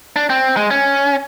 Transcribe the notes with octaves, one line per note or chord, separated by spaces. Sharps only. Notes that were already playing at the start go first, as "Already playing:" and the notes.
D4
C4
G#3
C#4